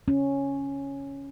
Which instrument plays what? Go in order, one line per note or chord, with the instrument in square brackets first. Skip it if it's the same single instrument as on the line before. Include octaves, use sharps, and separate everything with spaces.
[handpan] C#4